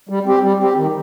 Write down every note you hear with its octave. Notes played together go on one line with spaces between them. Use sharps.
G3
C4 G4
G3
C4 G4
D#3